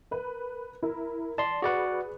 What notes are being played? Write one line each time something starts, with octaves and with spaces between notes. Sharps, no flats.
A#4 B4
E4 A#4
D5 A5 C6
F#4 G#4 B4 D5 F#5